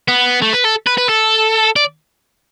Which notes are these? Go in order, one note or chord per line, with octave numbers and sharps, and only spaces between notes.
B3
A3
B4
A4
B4
B4
A4
D5